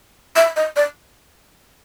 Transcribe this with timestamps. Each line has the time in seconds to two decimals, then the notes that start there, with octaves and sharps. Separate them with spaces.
0.36 E5
0.56 D#5
0.76 D5